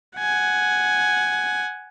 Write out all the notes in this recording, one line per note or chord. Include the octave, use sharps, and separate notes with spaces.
F#5 G#5